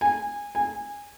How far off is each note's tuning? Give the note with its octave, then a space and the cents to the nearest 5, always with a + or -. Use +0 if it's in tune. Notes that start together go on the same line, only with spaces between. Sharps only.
G#5 -20
G#5 -20